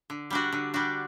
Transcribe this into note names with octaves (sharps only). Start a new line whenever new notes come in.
D3
G3 D4 F#4
D3
G3 D4 F#4